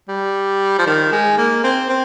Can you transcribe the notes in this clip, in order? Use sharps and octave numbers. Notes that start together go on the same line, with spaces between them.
G3
F3
D#3
G#3
A#3
C4
C4